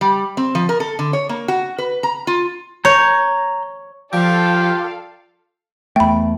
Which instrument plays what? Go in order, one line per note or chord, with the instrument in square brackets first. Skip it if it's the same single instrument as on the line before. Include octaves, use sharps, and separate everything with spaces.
[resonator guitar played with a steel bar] G3
C4
F3
A#4
A4
D3
C#5
A#3
F#4
B4
A#5
F4
[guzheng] C#5 [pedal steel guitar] A#5 G6
[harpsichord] F3 [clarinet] F4 [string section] A4 F5 [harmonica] D5 G5
[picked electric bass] E2 A3 [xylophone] G5 B5